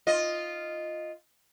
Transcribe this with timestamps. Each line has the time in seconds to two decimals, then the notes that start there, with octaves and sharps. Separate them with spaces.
0.07 F4 D#5